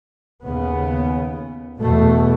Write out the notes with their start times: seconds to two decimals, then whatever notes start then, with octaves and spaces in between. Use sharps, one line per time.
0.43 D#2 C#3 B3
1.80 E2 B2 A3